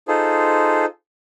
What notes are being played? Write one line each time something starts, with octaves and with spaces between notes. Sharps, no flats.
D#4 F4 G#4 A4 C5